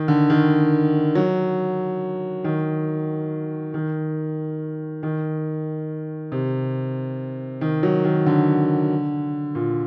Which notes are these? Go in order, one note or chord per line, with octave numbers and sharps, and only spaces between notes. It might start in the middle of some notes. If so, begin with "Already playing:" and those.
Already playing: D#3
D3
D#3
F#3
D#3
D#3
D#3
C3
D#3
F#3
D#3
D3
A#2